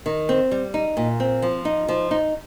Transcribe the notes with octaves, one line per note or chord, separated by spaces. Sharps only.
D#3
C4
G3
D#4
A#2
C4
F3
D#4
F3
D#4